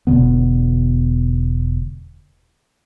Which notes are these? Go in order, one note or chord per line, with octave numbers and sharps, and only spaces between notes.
E1 B2 D3 B3